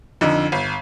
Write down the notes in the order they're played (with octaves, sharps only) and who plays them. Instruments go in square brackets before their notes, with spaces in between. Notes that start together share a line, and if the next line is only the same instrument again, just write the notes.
[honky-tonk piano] F2 D3 D#4
G1